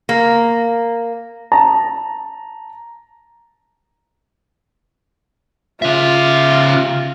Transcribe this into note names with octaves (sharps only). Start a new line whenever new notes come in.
A#3
A5 A#5
C#3 F4 E5